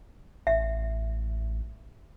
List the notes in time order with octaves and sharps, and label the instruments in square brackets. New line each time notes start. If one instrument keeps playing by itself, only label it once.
[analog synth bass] A1 [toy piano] E5